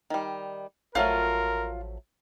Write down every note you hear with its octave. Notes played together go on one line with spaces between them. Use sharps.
D#3 G3
A1 F3 F#3 A3 F4 A#4 F6